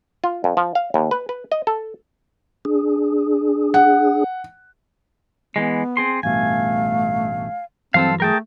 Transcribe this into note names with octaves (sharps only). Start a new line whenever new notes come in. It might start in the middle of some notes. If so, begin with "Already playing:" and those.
F4
F2
F3
F5
D#2
B4
B4
D#5
A4
D4 G#4
F#5
E3 G#3 B3
C4 G#4 C6
A1 G2 B2 A3 F5 G#5
G2 E3 F#3 C4 A4 C5 F5 A5
A3 G#4 A#4 G5 A5